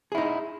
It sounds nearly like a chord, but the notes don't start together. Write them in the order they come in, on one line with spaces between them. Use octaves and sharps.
G#4 E4 D#4